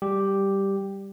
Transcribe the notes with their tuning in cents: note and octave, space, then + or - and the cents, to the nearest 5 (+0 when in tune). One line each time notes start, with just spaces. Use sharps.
G3 +0 G4 +0